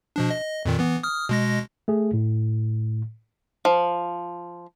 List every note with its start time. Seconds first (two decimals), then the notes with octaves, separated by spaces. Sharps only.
0.16 B2 F3 D4
0.30 D#5
0.65 F2 A#2 D#3
0.79 E3 B3
1.03 D#6 F6
1.29 B2 G#3 A#6
1.88 A3 G#4
2.13 A2
3.65 F3